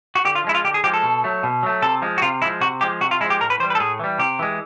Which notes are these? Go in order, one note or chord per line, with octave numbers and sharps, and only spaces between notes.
F#4
D3 G4
F4
F3 G#3 E4
F4
D3 G4
G#4
F3 G#3 G4
A4
B2
F#3 A3
B2
F#3 A3
C3 A4
F3 G#3
F#4
C3 F4
F3 G#3 E4
C3 F#4
F3 G#3 G4
C3 F#4
F4
F3 G#3 E4
G4
A2 A#4
B4
E3 G3 C5
B4
A4
A2 G#4
E3 G3
C3 G4
E3 G#3